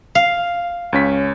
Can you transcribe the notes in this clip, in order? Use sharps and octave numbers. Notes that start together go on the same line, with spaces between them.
F5
C#2 C#4 B6